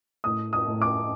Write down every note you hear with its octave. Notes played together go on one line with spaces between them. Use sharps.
A2 D#6
D#6
A2
D6